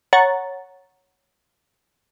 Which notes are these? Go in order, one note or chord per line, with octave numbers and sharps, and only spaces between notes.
C#5 F#5 A#5 A6